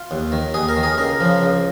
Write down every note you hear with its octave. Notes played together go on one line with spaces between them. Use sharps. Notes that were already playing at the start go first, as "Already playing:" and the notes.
Already playing: F4
D#2
D#3
D#2 G#4
A#4
D#3
G#4
C#2 A#4
C#3 F3
C#2